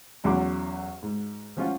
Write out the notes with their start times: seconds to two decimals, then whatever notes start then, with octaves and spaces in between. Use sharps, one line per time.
0.24 B1 E2 F#3 C#4 C6 D6
1.03 G#2
1.57 F3 C#4 F4 F#5